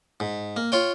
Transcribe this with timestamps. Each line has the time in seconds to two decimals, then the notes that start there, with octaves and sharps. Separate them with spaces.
0.20 G#2
0.56 A#3
0.72 F4 C#5 G5